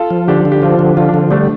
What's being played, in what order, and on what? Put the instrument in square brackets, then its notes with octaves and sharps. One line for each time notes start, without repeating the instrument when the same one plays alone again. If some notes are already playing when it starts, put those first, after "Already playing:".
Already playing: [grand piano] F4 A4
[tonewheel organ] F3
[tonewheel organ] D3 [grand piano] D4 G4
[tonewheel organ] D3
[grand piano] G4
[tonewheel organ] F3 [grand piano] C4 F4
[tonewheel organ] D3
[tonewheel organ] F3 [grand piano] F4
[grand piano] D4
[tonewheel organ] D3 [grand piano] C4 F4
[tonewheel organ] G3 [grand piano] A3 D4